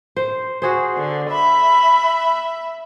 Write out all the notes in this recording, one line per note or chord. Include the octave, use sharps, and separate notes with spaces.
C5
F#4 G#4 C5
D3
E5 B5